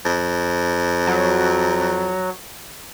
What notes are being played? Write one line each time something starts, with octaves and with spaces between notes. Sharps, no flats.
F2
F#3